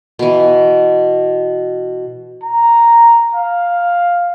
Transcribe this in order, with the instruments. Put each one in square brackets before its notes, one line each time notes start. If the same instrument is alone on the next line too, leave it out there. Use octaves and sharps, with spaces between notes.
[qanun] B2 E3
[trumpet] A#5
F5